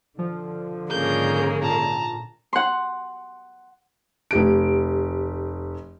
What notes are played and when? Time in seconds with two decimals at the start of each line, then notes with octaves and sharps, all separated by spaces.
0.19 D3 F3
0.90 G#2 C#3 A#3 G6
1.62 A#2 A5 A#5
2.53 F#5 C6
4.31 F1 G4 D7